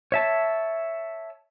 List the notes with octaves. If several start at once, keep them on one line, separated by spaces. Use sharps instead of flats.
C#5 E5 A5